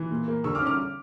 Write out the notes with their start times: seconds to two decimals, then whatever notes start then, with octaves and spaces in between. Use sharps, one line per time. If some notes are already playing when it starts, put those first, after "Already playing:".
Already playing: E3
0.10 A#2
0.28 A#3
0.44 D3 C#6 E6
0.55 D6 F6
0.60 C#4
0.66 D6 F6